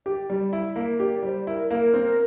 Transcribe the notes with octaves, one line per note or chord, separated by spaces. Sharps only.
G4 D5
G3
E4 E5
A#3
G4 D5
G3 C5
E4 A#4
A#3 A#4
C4